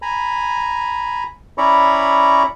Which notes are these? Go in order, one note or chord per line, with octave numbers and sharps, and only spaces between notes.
G#5 A#5 B5
C#4 E4 D5 A#5 B5 C#6